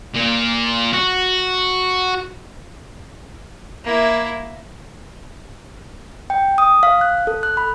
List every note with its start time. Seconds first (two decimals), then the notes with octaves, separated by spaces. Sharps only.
0.14 A#2
0.93 F#4
3.85 A#3 E4
6.30 G5
6.58 D#6
6.83 F5
7.01 F#6
7.27 A4
7.43 F#6
7.57 B5